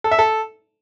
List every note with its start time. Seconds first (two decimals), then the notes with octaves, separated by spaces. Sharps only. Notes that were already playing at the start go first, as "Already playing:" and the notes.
0.04 A4
0.11 E5
0.19 A4